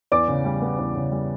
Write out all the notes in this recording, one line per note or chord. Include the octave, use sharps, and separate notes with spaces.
E2 D5 D6
C#3
G3
B3
E2
C#3
G3